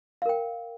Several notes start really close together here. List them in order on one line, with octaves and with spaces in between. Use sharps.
F5 A#4 G5